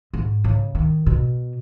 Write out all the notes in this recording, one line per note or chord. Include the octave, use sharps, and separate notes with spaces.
G#2
C#3
D#3
B2